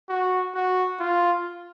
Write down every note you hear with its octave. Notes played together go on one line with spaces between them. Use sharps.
F#4
F#4
F4